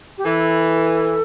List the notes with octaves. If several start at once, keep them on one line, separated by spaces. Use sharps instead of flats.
G4
E3 A4